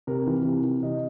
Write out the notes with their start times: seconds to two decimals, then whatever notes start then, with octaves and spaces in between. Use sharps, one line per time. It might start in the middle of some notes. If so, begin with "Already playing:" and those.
0.07 C3 A#4
0.27 E3
0.45 C3
0.64 E3
0.83 C3 D#5